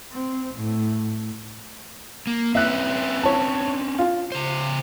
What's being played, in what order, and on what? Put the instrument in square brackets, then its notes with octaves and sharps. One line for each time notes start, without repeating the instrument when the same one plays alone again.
[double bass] C4
A2
[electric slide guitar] A#3
[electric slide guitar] C4 C#4 B4 [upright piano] E5 F#6
[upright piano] C#5 A5
F4
[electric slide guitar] C#3 C5